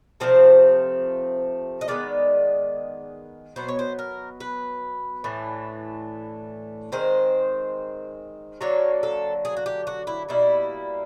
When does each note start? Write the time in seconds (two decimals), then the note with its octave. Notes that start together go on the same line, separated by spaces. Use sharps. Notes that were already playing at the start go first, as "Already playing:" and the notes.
0.20 C3 F3 A3 C4 C5
1.81 D#5
1.88 D#3 G#3 B3 D5
3.56 B2 F#3 B3 C5
3.68 C#5
3.79 C5
3.99 A#4
4.40 B4
5.24 A2 E3 A3 D4
6.92 D#3 G#3 C4 C5
8.61 D3 F#3 A#3 C#5
9.03 A4
9.45 G#4
9.57 F#4
9.66 G4
9.87 F#4
10.07 E4
10.29 B2 G3 A#3 E4